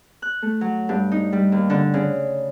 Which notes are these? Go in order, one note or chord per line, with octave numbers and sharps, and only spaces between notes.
F#6
A3
F#3
G2
D#4
G3
D#2
D3
C#3